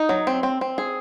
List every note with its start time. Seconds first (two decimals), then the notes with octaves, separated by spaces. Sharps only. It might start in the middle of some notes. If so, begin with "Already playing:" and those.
Already playing: D#4
0.09 F#3
0.27 C4
0.43 C4
0.61 C4
0.78 G#4